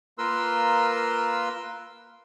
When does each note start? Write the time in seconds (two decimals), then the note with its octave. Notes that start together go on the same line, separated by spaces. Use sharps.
0.18 A#3 F4 A#4 B4 C6 E6